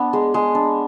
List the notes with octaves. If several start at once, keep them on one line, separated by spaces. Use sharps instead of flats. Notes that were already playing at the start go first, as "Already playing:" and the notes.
Already playing: B3 D4
G#3
G#3
D4